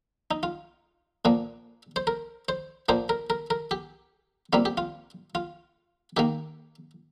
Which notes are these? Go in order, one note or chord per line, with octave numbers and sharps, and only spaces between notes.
D#4
F4
A#2 F3 A#3
C5
A#4
C5
A#2 F3 A#3 C5
A#4
A#4
A#4
G4
C3 G3 A#3 F4
G4
F4
F4
D#3 A#3 G4